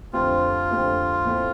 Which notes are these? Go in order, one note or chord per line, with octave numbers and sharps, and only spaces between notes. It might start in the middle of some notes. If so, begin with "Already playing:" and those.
F2 D3 A3 C4 F4 G4
F2 D3 A3 C4 G4
A2 A3 C4